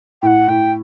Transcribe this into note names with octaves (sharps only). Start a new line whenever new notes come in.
A2 F#5 G5
A2 G5